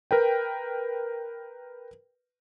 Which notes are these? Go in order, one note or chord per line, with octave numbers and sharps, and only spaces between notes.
A#4 B4 G5